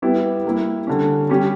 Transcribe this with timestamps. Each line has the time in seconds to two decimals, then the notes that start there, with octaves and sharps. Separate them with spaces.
0.02 G3 B3 E4 G4
0.44 G3 A#3 E4
0.87 D3 G3 C#4
1.29 G3 C#4 G4